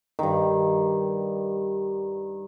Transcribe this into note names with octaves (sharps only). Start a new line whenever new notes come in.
G2 D#3